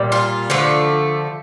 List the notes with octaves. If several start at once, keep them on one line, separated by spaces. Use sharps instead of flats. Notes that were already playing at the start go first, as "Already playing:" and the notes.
Already playing: A#2 G3
F4
D3 F3 A3